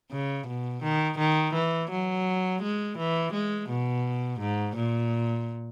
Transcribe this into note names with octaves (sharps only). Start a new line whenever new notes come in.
C#3
B2
D#3
D#3
E3
F#3
G#3
E3
G#3
B2
G#2
A#2